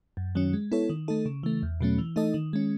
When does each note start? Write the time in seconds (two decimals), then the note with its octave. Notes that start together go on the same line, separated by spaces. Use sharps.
0.17 F#2
0.35 D#3 F#3 C#4
0.53 G#3
0.72 B3 E4 A4 C#5
0.89 D#3
1.08 A3 D#4 A4
1.26 C#3
1.43 E3 A3
1.63 E2
1.81 B2 F#3 A3 C#4
1.98 E3
2.16 A3 D#4 A4 D#5
2.34 D#3
2.53 G#3 C#4